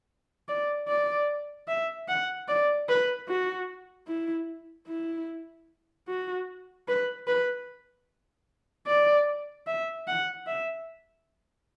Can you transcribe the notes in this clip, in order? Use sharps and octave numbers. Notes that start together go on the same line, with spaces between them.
D5
D5
E5
F#5
D5
B4
F#4
E4
E4
F#4
B4
B4
D5
E5
F#5
E5